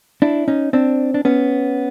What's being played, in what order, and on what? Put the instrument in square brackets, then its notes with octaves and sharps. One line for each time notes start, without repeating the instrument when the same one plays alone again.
[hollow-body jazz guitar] D4 E4
C#4 D#4
C4 D4
D4
B3 C#4